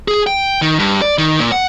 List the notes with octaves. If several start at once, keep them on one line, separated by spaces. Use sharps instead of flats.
G#4
G5
D#3
G2
D5
D#3
A#2
F#5